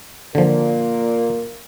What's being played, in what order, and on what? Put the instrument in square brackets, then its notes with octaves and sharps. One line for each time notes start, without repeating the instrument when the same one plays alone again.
[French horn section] A#2 A#3 [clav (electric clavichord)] D3 F3